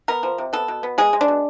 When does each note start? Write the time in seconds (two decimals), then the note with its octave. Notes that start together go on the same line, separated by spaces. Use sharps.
0.08 B3 A#4
0.23 F3
0.38 C3
0.53 B3 A4
0.68 B2
0.83 B3
0.98 G#3 G#4
1.13 G#3
1.21 D4
1.28 B2